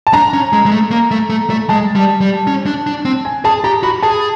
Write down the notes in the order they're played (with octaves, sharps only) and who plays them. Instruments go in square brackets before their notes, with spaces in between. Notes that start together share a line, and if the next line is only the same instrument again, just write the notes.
[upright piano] A5
[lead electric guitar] D4 [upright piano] A#5
[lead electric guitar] C#4
G#3
G#3
A3
A#3
A3
A3
A3
[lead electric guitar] G#3 [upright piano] A5
[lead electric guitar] G3
G3
C#4
D4
D4
C4
[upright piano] G#5
[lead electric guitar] G#4 [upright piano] A5
[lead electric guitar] G4 [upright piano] A#5
[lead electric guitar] F#4 [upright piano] B5
[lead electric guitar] G#4 [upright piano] A5